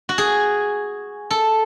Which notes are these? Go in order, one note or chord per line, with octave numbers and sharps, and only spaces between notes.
F#4
G#4
A4